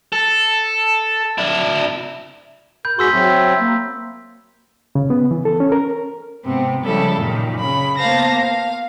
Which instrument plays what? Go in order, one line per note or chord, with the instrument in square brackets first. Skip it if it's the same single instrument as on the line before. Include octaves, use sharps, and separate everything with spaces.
[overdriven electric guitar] A4
D4 E4
[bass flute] A#4 [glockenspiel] B5 G6
[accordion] G#2 F#4 G#4 [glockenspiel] C6 E6 B6
[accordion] F#3 C4 [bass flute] E5
[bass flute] A#3
[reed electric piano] C#3
B3
E3
A4
C#4
A#4
[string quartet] G#2 C3 B3 C4
C#3 F3 G3 G#3 E4 A4
F#2 A#2 D#3
C#3 B5
A#3 B3 C5 F5 A5 A#6
F5